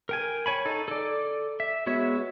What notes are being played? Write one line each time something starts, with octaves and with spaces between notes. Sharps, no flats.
A#4 G5 G#5
C#5 G#5 B5
D#4 A4
A4 D5
E5
G#3 B3 F#4 C#5 E5